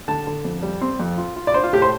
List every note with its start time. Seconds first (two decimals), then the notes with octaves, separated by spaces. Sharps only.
0.08 D3 A5
0.27 D3
0.44 F2
0.63 G3
0.81 C4
1.00 F2
1.18 F4
1.36 F4
1.47 D5
1.54 D4 C5
1.64 F4
1.73 A2 G4
1.82 C5